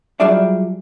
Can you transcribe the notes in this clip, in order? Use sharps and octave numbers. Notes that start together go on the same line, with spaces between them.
F#3 G3 F4 G#4 D5 E5